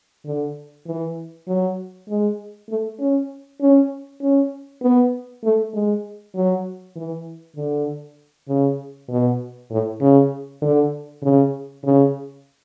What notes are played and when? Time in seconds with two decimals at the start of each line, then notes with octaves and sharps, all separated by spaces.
0.25 D3
0.86 E3
1.48 F#3
2.08 G#3
2.69 A3
2.99 C#4
3.61 C#4
4.22 C#4
4.82 B3
5.44 A3
5.73 G#3
6.35 F#3
6.96 E3
7.57 D3
8.48 C#3
9.09 B2
9.71 A2
10.01 C#3
10.62 D3
11.22 C#3
11.84 C#3